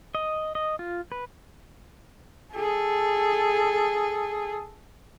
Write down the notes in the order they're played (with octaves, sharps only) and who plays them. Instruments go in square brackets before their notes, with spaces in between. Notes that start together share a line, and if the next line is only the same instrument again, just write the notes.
[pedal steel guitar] D#5
D#5
F4
B4
[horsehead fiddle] G#4 A4